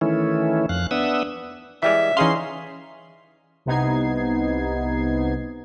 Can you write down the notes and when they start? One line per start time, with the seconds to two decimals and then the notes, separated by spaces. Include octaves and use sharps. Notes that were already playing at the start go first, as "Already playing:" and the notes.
0.01 D#3 E3 A3 C#4 E4
0.69 F2 F5 F#6
0.91 B3 D4 E5 F#5 D#6 E6
1.83 E3 G3 G#3 E5
2.17 E3 C#4 D#4 G#4 F5 C6
3.65 C2 C3 B3 D#4 G#6 C7